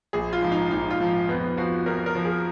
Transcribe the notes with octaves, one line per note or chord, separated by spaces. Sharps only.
A#1 G#4
F4
G#2 F3
D#4
A#1 D#4
F4
G#2 F3
F2 B3
F3 F#4
F2 A#4
A#4
F3
G#4